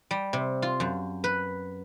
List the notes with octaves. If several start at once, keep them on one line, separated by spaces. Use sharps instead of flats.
G3
C3
F4
F#2
B4